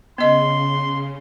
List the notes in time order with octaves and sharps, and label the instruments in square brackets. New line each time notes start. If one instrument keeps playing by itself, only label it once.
[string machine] C#3 [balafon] B3 D#5 [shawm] C6